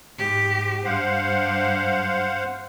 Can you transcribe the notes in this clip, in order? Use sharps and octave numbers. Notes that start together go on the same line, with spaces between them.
G#2 G4
G2 C5 F5 F#5